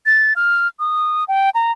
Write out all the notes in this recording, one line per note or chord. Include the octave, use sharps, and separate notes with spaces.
A6
F6
D#6
G5
A#5